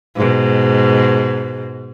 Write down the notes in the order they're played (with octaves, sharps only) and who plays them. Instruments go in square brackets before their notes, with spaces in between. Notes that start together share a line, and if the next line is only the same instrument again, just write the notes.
[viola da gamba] G#2 B2